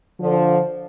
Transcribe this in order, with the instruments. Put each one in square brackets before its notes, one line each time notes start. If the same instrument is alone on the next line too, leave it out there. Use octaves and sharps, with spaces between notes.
[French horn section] D3 F3